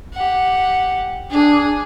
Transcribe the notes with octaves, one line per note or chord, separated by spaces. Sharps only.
G4 F#5
D4 G#4